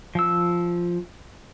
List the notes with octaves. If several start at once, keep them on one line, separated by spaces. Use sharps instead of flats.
F3 E6